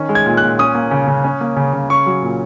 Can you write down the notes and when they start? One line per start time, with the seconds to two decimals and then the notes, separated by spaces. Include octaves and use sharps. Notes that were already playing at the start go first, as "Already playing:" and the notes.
Already playing: D#3 C#4
0.09 G#3
0.15 G#6
0.26 A#2
0.37 F#6
0.43 A#2
0.59 C#4 D#6
0.75 A#3
0.91 C#3
1.08 C#3
1.24 C#4
1.41 A#3
1.57 C#3
1.73 C#3
1.89 C#4 C#6
2.06 F#3
2.22 A#2